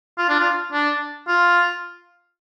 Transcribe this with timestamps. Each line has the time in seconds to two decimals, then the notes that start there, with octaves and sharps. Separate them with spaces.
0.18 F4
0.29 D4
0.39 F4
0.72 D4
1.28 F4